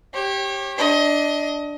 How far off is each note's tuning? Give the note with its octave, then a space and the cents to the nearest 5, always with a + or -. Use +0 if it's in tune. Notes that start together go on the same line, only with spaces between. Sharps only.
G4 +0 C#5 -35
D4 +0 D#5 +25